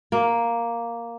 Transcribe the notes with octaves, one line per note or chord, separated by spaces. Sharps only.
A#3